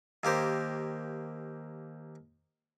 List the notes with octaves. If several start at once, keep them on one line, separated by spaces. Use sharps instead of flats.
D#2 A#3 G4 C5